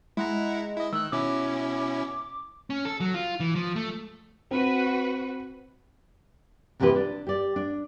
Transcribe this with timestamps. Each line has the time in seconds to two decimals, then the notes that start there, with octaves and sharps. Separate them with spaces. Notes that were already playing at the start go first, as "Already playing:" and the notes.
0.17 G#3 E4 F#5 A#5
0.77 E4 D#5
0.93 D#3 E6 F#6
1.12 B2 C#4 E4 D6
2.70 C#4
2.85 A4
3.00 F#3
3.14 F4
3.40 E3
3.56 F3
3.76 A3
4.51 C4 F#4 B4
6.80 D#2 C3 E3 F3 G4 B4
6.96 D4
7.27 G4 D5
7.56 D4